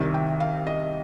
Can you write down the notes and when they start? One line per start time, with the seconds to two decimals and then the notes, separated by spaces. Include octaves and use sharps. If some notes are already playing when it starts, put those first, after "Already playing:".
Already playing: C2 C3 D#3 G3
0.14 G5
0.40 F5
0.67 D#5